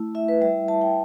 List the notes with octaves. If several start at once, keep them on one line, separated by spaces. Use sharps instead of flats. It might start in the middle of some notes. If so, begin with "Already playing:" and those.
Already playing: A3 E4
E4 E5
B4
G3 E5
G3 A5
G5